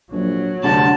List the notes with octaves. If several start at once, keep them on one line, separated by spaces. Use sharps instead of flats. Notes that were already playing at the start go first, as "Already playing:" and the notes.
A#1 F#3
D2 C3 G#4 F#5 A5